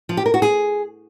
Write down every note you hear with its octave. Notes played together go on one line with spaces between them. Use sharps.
F3
G4
A#4
F#4
G#4